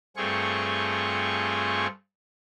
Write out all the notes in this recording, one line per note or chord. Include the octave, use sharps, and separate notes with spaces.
G2 A3 C4 F4 G#4 C#6